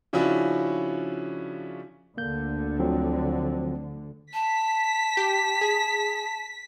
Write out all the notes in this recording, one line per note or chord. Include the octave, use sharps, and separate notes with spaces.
C#3 F3 C#4 D4 E4 F#4
D2 D3 A#3 G6
F3 F#3 C4
A5 B6
G4
G#4